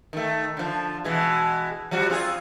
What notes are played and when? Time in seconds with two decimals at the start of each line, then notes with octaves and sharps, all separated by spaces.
0.13 D#3 A3
0.57 D3 F3
1.04 B2 E3 G#3
1.91 F3 G3 F#4
2.10 C4 F4 G#4